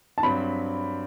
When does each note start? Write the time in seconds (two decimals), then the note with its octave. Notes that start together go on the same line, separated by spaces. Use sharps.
0.18 A5
0.23 G2 F#3 C4 B5